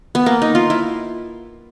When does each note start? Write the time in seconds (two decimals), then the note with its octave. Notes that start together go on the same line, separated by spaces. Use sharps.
0.15 B3
0.26 A#3
0.42 D#4
0.55 F4
0.70 E4